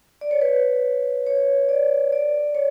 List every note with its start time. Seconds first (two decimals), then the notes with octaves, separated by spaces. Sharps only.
0.21 D5
0.31 C#5
0.41 B4
1.27 C#5
1.69 D5
2.12 D5
2.55 C#5